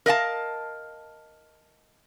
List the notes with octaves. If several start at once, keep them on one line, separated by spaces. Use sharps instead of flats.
A#4 D#5 F5 A5